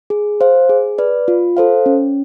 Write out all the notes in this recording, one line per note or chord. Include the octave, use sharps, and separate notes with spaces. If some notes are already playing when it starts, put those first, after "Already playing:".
G#4
C5 F5
G#4
B4 D5
F4
A4 C5 F5
C#4